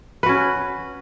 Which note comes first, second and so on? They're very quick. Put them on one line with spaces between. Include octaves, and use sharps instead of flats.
B4 F#4 C#4